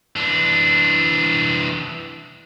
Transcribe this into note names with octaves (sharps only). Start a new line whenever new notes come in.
E3 D4